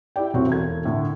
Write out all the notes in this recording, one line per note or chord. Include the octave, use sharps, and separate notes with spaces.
E4 G4 D5 G5
F1 C2 C3 C4 F#4 C#5
E1 A4 G#6
A2 D3